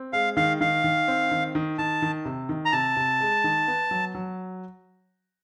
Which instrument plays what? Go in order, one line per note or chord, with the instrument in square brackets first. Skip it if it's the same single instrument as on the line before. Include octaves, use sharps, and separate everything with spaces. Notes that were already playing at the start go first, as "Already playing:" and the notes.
Already playing: [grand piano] C4
[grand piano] G#3 [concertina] F5
[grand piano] D#3 [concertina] F5
[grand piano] D#3 [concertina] F5
[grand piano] D#3
C4
D#3
D#3
[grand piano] D#3 [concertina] A5
[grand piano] D#3
C3
D#3
[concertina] A#5
[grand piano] C3 [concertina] A5
[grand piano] C3
G#3
D#3
B3
F#3
F#3